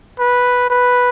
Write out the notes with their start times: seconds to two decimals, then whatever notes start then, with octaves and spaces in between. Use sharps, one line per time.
0.20 B4
0.70 B4